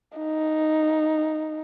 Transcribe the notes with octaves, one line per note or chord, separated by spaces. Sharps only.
D#4